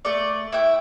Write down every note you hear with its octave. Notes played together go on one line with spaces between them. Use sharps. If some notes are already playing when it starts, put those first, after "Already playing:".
A3 D5
E4 E5 G5